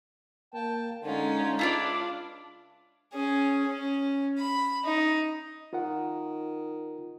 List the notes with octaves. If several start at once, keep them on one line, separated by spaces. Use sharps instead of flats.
A#3 G5 A5
D3 G#3 C#4 D#4 F4
C#2 D4 E4 F4 D5
C#4 G#4
C#4
B5
D#4
D#3 F4 A#4 F#5